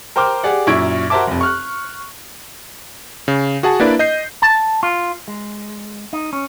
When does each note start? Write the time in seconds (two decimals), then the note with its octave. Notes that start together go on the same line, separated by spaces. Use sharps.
0.16 A#4 C5 G5 C6 D6 F6
0.43 G4 G#4 D5 F#5
0.67 F#2 A#2 E4 C#6 G#6 D7
1.10 F#4 A#4 C5 E5 A5 D6
1.27 F1 F2
1.41 C#6 F6 F#6
3.28 C#3
3.63 F#4 G#4 F#5 A5
3.80 A#3 D4 E4 B4 D5
3.99 D#5 G6 C7
4.42 A5
4.83 F4
5.28 G#3
6.13 D#4
6.33 C#4